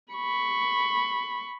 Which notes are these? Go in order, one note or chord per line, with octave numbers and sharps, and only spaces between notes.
B5 C#6